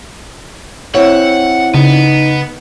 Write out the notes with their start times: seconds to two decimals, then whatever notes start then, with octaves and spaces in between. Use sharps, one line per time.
0.95 C4 E4 C#5 F#5
1.74 C#3 B3 D#4